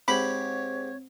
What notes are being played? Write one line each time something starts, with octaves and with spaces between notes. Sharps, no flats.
G#2 C4 G4 C#5 B5